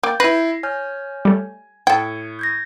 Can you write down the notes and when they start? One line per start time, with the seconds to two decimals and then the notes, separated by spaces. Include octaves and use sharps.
0.03 A#3 G5 D6 G6 A6
0.20 E4 B4 A#6 C7
0.63 C#5 G#5 F6 G6
1.25 G3 A3
1.87 A2 A4 G5 G#6 C#7
2.39 G6 G#6 A#6